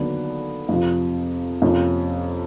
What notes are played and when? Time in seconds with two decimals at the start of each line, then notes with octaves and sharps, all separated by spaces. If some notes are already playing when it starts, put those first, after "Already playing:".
Already playing: D#2 D3 F#3 B3 D4
0.69 F2 C3 F3
1.62 F2 C3 F3 A#3 C#4